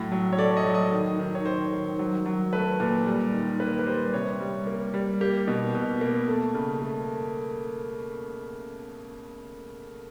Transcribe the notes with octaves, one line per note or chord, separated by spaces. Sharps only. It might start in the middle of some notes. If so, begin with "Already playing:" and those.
Already playing: A2 F#3
F#3
C#5
A3 D5
D#5
F#3
D#5
D#3
D#3
C#5
D#3 C5
D#3
F#3
F#3
A3 B4
A#2
G3
D#3
A#3 B4
B4
G3 C5
C5
C3 C#5
G3
A#3
G3
A#3 G4
B2
B2
A#3
A3
C#3
A3